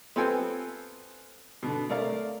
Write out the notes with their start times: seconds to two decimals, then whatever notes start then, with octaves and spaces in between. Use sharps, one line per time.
0.16 B3 C4 F4 A4 G5 G#5
1.63 B2 D3
1.89 A3 A#4 D5 F5